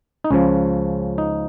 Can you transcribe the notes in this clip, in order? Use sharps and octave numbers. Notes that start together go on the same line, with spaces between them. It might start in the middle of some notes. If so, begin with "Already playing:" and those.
D#4
C#2 C#3 F3 C#4
D#4